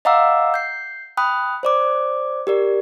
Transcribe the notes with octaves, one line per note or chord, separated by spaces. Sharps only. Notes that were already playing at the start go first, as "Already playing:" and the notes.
D#5 F5 F#5 A#5 D6 E6
G6 C7
G5 B5 D#6 F#6
C5 D5 D6
G4 A#4 D5